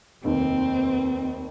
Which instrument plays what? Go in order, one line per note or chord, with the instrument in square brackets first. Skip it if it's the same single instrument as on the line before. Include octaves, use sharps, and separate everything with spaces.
[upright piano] F1 D#2 D#3 [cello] C4